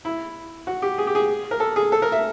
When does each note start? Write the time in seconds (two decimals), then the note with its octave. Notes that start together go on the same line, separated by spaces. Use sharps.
0.05 E4
0.67 F#4
0.82 G4
0.98 G#4
1.07 G4
1.15 G#4
1.51 A#4
1.60 A4
1.76 G#4
1.92 A4
2.02 A#4
2.12 E5